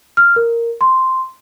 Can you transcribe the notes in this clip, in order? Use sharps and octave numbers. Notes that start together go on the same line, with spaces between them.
F6
A#4
C6